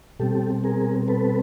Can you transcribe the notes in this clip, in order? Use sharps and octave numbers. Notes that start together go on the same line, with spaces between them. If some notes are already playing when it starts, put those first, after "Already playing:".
B2 G3 C4 G4 A4
G#4 A#4
A4 B4